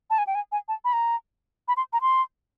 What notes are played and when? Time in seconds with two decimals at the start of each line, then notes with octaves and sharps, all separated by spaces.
0.10 A5
0.18 G#5
0.27 G5
0.35 G#5
0.52 G#5
0.68 A5
0.85 B5
0.93 A#5
1.68 B5
1.77 C6
1.93 A#5
2.02 C6